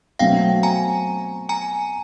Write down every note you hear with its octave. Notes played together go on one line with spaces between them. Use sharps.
B2 F#3 A3 C4 F5 G5
G#5 A#5
G#5 A#5